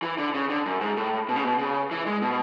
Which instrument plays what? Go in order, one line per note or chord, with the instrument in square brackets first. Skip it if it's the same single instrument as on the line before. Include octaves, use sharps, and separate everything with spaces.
[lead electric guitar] E3
D3
C#3
D3
F#2
G#2
A2
B2
C#3
B2
C#3
E3
G#3
B2